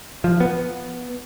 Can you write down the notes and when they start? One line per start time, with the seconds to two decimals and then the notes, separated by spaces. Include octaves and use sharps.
0.24 F3
0.40 B3